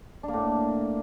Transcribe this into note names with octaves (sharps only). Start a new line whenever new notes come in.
A2 A#3 D4